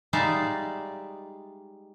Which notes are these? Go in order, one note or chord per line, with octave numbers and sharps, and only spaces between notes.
G3 G#3 D#4 D5 E5 F5